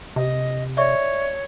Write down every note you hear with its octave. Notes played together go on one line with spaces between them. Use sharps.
C3 D#5
C#5 D5 E5 C#6